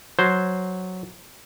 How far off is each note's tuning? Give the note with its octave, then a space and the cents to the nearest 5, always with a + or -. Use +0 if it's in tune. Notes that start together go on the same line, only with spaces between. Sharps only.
F#3 +0 C5 +0